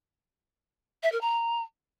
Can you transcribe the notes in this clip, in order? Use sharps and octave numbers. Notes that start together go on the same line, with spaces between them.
E5
A#4
A#5